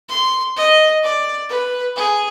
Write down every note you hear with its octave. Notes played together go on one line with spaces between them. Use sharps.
C6
D#5
D5
B4
G#4